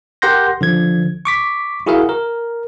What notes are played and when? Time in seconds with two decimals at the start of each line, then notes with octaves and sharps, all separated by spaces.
0.22 G4 A#4 F#5 C6 G6 A#6
0.61 D3 F3 G#6
1.25 C#6 D6 B6
1.86 E4 F#4 G#4 A#4 E5 F5
2.09 A#4